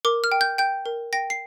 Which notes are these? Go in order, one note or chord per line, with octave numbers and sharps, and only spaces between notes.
A#4 D6
F6
G5
G6
G5 G6
A#4
G5 A#6
C7